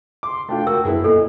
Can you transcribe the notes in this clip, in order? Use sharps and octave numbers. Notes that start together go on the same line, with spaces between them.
C6 D6
A3 D4 F4 G5
F#4 A#4 E6
F#2 B3 E4 G#4
A#2 A4 D#5